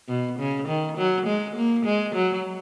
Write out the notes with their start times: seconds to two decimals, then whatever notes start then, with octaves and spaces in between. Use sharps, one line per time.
0.08 B2
0.39 C#3
0.68 D#3
0.98 F#3
1.27 G#3
1.56 A#3
1.85 G#3
2.15 F#3